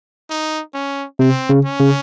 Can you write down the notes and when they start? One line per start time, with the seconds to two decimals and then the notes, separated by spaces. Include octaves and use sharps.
0.30 D#4
0.74 C#4
1.19 C3 C4
1.49 C#3
1.65 C#4
1.80 C#3